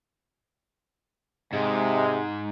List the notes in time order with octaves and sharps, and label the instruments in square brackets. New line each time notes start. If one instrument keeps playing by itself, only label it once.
[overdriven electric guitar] G#2 [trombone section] C3 G#3